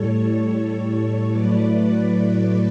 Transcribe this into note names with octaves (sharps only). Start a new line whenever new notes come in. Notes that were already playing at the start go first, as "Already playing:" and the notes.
Already playing: A2 G3 A4 C#5
A2 F#3 A3 B4 D5
B4 D5